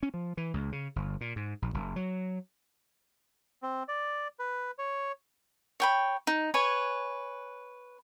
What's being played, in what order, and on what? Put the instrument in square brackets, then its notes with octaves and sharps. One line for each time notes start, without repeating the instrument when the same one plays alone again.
[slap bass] C#4
F3
E3
C#2
C#3
G1
A#2
G#2
A#1
F#1
F#3
[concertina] C4
D5
B4
C#5
[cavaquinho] C#5 G5 B5
D#4
B4 C#5 G#5